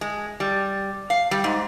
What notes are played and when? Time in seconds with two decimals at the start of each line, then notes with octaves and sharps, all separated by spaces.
0.01 G#3
0.40 G3
1.10 F5
1.31 G3
1.44 G#2